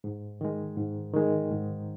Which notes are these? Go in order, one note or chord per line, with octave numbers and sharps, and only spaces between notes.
G#2
D#3 G#3
G#2
D#3 G#3
G#2